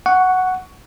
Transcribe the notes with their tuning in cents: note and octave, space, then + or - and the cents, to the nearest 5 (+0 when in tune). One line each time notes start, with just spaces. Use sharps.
F#5 +0 C#6 +10